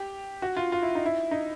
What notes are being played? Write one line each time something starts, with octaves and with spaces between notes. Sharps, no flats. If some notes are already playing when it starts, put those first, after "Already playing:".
Already playing: G4
F#4
F4
F4
E4
D#4
E4
D#4